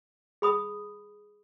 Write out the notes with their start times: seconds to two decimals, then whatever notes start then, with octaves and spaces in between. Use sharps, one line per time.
0.42 G#4 B5 D#6